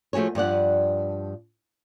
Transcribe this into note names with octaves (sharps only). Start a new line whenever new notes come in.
F3 A3 F#4 G#4 C#5
G2 F3 D5 F#5